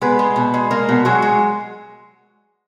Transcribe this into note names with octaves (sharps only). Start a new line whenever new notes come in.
G#3 B3 B4
G#3
B2
G#3
G#3 A#3 A#4
B2
F#3 G#3 F#4
G#3